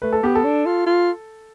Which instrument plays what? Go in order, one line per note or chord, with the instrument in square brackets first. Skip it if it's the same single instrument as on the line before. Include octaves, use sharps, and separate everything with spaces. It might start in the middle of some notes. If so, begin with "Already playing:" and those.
[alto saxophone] A3 [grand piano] B4
[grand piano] A4
[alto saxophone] B3 [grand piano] G4
[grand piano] A4
[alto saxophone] D4
F4
F4